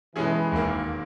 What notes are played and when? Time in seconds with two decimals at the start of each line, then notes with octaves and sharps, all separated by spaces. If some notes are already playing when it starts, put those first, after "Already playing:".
0.15 B2 E3 G#3 C#4 G#4
0.51 E1 D#2 D#3 A#3